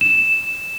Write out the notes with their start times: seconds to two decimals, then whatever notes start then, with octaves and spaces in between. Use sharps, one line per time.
0.01 E7